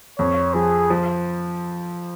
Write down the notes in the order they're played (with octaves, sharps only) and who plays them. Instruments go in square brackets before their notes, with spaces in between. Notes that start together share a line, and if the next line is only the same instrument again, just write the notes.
[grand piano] F2 [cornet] C#5
[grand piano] F3 [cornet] G#4
[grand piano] F3